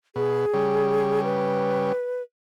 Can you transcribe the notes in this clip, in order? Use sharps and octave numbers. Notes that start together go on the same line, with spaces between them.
B2 G#4
C#3 G3
B4